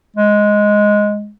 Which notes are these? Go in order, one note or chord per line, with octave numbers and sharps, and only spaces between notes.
G#3